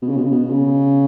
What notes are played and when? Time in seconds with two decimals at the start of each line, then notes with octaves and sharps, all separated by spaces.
0.02 B2
0.09 C#3
0.17 B2
0.24 C#3
0.31 B2
0.51 C#3